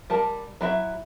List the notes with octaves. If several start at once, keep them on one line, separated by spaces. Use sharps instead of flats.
G3 A#4 A5
F#3 E4 E5